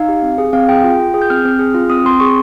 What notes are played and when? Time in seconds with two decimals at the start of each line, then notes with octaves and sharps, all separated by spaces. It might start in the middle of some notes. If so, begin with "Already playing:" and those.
Already playing: D#4 F5
0.09 G4
0.23 C4
0.38 G#4
0.53 C4 F5
0.69 G#4 G5
0.83 F4
0.99 F4
1.14 G#4
1.22 G6
1.30 C4 F6
1.45 C4
1.59 G#4
1.74 F4
1.90 C4 D#6
2.05 C4 C6
2.20 G#4 C#6